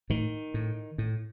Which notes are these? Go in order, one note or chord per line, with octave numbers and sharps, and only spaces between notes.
A2 D#3
A2
A2